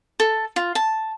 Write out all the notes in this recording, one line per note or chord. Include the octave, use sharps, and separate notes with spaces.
A4
F4
A5